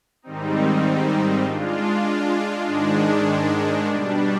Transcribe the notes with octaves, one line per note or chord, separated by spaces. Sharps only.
G#2 D#3 G3 C4 D#4
G#3 D4 F4
G#2 D#3 G#3 D4
B2 G3 D4